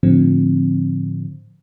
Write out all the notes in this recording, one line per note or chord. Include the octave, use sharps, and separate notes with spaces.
A2 D3 F3 C4